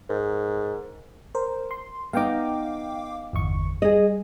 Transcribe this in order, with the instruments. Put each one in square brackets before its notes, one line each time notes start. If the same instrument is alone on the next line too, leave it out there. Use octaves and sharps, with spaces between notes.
[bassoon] G#2 [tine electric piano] A#4
[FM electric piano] A#4 C5
C6
[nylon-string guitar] B3 D#4 [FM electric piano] F5 G5 D6
[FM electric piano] G1 E2 C#6
[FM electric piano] G3 [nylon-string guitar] G#4 D#5